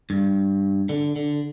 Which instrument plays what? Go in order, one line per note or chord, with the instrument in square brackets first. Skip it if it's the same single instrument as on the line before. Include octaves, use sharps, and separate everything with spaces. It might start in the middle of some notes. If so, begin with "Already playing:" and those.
[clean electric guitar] G2
D3
D3